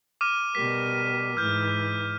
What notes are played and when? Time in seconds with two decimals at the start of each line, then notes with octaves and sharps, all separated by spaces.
0.21 D6 F6 D#7
0.55 B2 G3 A#4 B6
1.37 G#2 E3 F6 G6